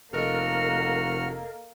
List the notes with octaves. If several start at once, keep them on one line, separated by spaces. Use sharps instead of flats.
F1 A#3 F#4 A4 A#4 D#5 F#5 F6